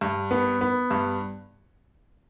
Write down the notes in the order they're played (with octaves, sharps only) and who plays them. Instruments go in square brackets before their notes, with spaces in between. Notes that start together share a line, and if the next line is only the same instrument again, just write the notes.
[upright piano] G2
B3
B3
G2